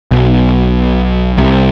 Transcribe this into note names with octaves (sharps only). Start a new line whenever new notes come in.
B1 B2
C2 C3